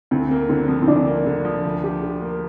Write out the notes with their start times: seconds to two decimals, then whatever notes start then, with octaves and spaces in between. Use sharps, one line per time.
0.11 D2 C4
0.31 A#3
0.49 D3 C4
0.68 F3
0.82 C4
0.87 D2 D4
1.07 A#3
1.26 D3
1.45 F3
1.64 D2
1.84 G4
2.03 D3
2.22 A#3